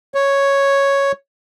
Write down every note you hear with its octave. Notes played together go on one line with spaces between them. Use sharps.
C#5